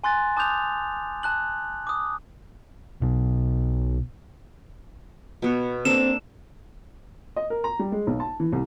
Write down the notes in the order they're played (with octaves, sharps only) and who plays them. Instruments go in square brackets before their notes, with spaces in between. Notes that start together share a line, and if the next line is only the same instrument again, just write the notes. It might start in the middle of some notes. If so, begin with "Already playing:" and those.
[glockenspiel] G#5 C6 F#6 A6
A5 D6 D#6 F#6 G6 F7
A5 F#6 F#7
D6 D#6
[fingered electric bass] B1 B2
[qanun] B2 B3 C#5
[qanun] A#3 D4 A4 [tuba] C4 [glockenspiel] E7
[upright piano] D#5
A#4
A#5
G3
G#3
B1
A5
E3
C2